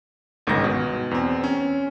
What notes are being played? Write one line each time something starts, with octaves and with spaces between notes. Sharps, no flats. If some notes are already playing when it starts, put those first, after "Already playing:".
G1 C#2 G#2 D#3 A#6
B2
E2 C4
C#4